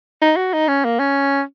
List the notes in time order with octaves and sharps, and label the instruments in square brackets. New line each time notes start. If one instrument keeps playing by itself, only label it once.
[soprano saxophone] D#4
F#4
D#4
C#4
A#3
C#4